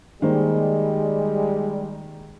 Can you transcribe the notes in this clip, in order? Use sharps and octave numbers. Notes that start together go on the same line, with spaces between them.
D#3 G3 G#3 A#3 C5